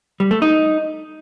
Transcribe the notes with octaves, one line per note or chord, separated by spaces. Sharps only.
G3
A3
D#4